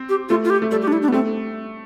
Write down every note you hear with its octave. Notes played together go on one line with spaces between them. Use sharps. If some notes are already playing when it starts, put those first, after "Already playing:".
Already playing: C4
G4
A3 F4
F4
G4
A3
G3 A4
G4
D4
E4
D4
B3
A3 C4